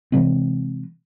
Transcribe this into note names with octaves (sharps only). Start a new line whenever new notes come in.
C3 E3 G#3 C4